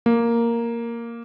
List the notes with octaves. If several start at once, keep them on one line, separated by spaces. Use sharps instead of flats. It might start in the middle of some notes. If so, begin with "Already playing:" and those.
A#3